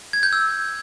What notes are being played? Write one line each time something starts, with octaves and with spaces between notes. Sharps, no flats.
G#6
G6
E6